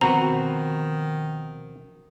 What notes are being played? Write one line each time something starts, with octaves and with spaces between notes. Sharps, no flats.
D2 B2 D#3 F3 C4 F#4 B4 A#5